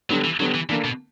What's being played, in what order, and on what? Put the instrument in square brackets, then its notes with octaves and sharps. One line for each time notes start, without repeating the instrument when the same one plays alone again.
[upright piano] D3 G3 B3 [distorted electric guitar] F#3
[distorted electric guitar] E3
[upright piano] D3 G3 B3 [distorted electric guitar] F#3
[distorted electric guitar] E3
[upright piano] D3 A#3 D4 [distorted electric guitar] E3
[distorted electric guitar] B2